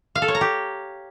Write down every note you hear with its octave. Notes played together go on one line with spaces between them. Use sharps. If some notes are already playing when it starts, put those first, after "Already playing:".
F5
A4
C#5
A#5
G4